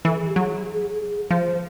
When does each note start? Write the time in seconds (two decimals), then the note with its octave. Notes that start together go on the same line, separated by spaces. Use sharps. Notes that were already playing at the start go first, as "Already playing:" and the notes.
0.05 E3 A4
0.16 G#4
0.27 G4
0.36 F#3 G#4
1.30 F3 C5